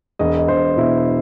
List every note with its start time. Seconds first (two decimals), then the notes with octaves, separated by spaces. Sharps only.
0.19 E1 D#5
0.38 D#5
0.48 E1 C5
0.77 B2 E4